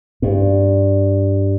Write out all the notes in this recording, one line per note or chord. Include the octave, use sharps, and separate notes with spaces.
G2